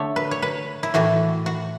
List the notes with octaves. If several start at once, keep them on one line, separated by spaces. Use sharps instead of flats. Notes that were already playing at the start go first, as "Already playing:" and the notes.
Already playing: D3 A3 C#5
B4
C#5
B4
E4
A2 E3 A3 F#4
F#4